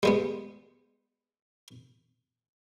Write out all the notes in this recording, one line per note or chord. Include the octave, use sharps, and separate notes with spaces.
G3 G#3 B3